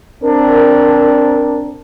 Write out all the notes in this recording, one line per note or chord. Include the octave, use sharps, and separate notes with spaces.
C4 D4 A#4